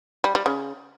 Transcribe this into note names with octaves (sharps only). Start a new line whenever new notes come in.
G3
G3
C#3